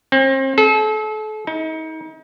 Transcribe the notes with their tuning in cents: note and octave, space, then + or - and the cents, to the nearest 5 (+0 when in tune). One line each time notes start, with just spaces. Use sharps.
C4 +35
A4 -40
D#4 +35